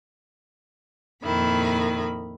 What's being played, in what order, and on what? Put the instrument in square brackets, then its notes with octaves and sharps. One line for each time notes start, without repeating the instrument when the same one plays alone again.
[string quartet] F2 A#2 D#3 E4 B5